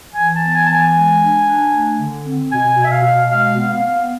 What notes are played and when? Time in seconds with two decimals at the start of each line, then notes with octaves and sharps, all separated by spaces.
0.14 E3 G#5
0.34 A5
0.41 B3
0.53 G#5
0.66 E3 A5
0.73 G#5
0.94 G#3
1.19 D4
1.46 D4
1.72 A3
1.98 D3
2.24 C4
2.51 B2 G#5
2.77 B2
2.84 E5
2.91 F5
3.03 B2
3.30 G#3 F5
3.56 B3
3.69 F5
3.82 B3